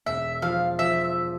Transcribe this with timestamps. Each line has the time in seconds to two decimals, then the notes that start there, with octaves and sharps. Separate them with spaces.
0.06 E1 E5
0.42 F3 F5
0.79 F3 E5